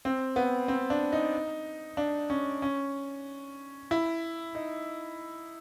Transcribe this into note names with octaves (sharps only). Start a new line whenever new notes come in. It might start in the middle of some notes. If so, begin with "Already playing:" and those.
C4
B3
C4
D4
D#4
D4
C#4
C#4
E4
D#4